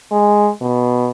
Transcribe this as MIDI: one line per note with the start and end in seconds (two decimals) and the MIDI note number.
0.11 0.51 56
0.62 1.11 47